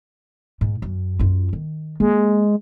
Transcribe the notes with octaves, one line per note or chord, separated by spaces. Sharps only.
G#2
F#2
F#2 F4
D#3
G#3 A#3